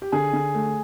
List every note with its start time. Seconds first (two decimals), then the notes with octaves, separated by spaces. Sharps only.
0.02 G4
0.12 D3 G#4
0.33 D3
0.54 A3